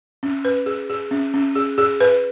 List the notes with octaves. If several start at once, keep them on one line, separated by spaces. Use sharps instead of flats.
C#4
B4
G#4
G#4
C#4
C#4
G#4
G#4
B4